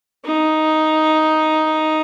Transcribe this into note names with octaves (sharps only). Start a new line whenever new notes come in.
D#4